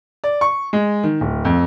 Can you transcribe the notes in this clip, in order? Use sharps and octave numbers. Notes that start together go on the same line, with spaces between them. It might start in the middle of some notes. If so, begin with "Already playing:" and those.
D5
C#6
G#3
D#3
D1
F2